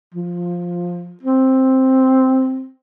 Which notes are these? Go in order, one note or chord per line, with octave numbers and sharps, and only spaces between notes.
F3
C4